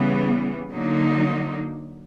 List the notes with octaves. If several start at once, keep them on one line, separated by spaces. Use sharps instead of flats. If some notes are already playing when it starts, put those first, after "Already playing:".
Already playing: C#3 E3 G3 B3
D3 F#3 A#3 D#4